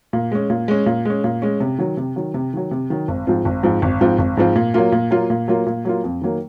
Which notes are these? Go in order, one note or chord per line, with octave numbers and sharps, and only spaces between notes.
A#2
G#3 C#4
A#2
G#3 C#4
A#2
G#3 C#4
A#2
G#3 C#4
C3
D#3 F#3
C3
D#3 F#3
C3
D#3 F#3
C3
D#3 F#3
G#1
G#2 F3 C4 F4
G#1
G#2 F3 C4 F4
G#1
G#2 F3 C4 F4
G#1
G#2 F3 C4 F4
A#2
F#3 A#3 F4
A#2
F#3 A#3 F4
A#2
F#3 A#3 F4
A#2
F#3 A#3 F4
F2
D#3 F#3 A#3